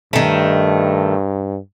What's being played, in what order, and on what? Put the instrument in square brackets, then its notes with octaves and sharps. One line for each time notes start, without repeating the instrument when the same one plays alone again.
[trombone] G2 [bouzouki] D#3 A3